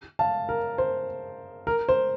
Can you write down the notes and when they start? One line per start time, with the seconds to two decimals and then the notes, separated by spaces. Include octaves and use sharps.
0.19 F5 A5
0.49 A#4
0.78 C5
1.67 A#4
1.89 C5